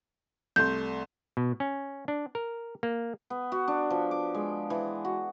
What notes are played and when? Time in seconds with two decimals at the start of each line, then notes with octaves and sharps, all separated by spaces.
0.56 C2 A3 C6 G6
1.37 B2
1.60 C#4
2.08 D4
2.35 A#4
2.83 A#3
3.30 B3
3.52 F#4
3.68 D4
3.90 F3
4.11 D6
4.34 G#3
4.70 E3
5.05 F#4